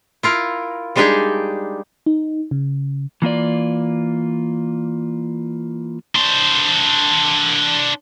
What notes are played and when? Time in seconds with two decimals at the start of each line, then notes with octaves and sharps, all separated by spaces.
0.23 E4 F4 A#4
0.96 G3 G#3 D4 D#4 G4 G#4
2.06 D#4
2.51 C#3
3.22 E3 A#3 F4 D5
6.15 D4 C5